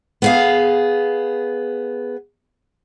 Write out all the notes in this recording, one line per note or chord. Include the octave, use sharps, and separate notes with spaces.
B3 G#4 F5